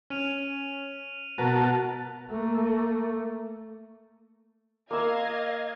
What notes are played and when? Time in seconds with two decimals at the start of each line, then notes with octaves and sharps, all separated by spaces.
0.10 C#4 F6 D#7 F7
1.38 B2 F#4 A#4 B4 A5 A#5
2.30 A3 A#3
4.91 A#3 D#5 F5 E6 G#6